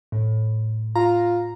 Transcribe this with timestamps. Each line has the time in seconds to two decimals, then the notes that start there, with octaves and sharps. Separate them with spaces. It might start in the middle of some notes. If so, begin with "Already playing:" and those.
0.12 A2
0.95 F4 A#5